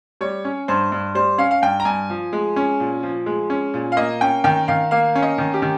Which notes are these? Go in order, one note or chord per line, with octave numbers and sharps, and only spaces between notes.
G3 C#5
C#4
G2 C5
G2
G3 C5
C#4 F5
F5
G2 G5
A#5
G2 G#5
F3
G#3
C#4
A#2
F3
G#3
C#4
A#2
F5
A#3 D#5
C#4 G5
D#3 G5
D#3 F5
A#3 F5
C#4
D#5
D#3
G4
D#3